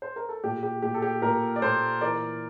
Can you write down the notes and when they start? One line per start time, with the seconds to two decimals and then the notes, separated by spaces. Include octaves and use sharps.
0.02 C5
0.16 A#4
0.29 A4
0.44 A#2 G4
0.63 G4
0.82 A#2 G4
0.94 A4
1.02 G4
1.22 A#2 G4 A#4
1.56 D5
1.62 A#2 A4 C5
2.01 E3 A#4 D5